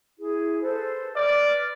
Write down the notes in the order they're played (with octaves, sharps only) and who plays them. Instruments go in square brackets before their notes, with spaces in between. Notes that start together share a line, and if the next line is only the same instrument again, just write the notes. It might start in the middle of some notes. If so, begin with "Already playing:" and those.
[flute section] E4 G#4
A4 B4 C5
[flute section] B4 F6 [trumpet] D5